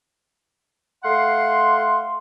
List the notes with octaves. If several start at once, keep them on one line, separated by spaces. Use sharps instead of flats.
A3 F5 F#5 C6